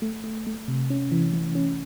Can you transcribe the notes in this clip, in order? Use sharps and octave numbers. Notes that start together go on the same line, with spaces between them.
A3
A3
A3
C3
C#4
E3
E3
C#4